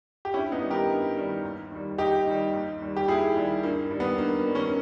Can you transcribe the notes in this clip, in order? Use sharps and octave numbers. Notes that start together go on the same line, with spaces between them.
G4
G2 C#4 E4
B3 D#4
D#3 G3
G4 A#4
G2
D#3 G3
D#2
D#3 G3
D#2 D#4 G4
D#3 G3
D#2
D#3 G3
G4
D#2 E4 G#4
D#3 G3
G2 A#3
D#3 G3
B3
G2 A#3
D#3 G3
A#3 C#4